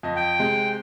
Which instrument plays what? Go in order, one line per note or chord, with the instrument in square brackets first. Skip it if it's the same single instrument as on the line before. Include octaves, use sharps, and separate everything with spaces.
[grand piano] F2 D#5
[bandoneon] G5
[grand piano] C3 G#3